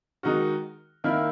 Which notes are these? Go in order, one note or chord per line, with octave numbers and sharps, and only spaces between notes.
D#3 G#3 D#4 F#4
D#3 A#3 E4